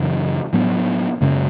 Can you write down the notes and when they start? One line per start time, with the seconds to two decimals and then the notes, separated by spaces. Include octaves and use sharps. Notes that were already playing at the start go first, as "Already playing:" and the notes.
Already playing: F#2 C#3 E3
0.53 A2 F#3 B3 D4
1.21 F#2 C#3 G#3 C#4